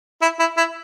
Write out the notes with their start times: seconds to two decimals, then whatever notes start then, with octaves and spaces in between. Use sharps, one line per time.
0.21 E4
0.39 E4
0.57 E4